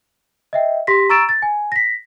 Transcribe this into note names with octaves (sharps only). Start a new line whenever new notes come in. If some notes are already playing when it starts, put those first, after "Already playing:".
D#5 E5 G5
G4 C6 A#6 B6
A#5 C#6 E6 A6 D7 E7
A6
G#5
A#6 B6